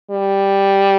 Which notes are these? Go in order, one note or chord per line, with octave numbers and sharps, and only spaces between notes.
G3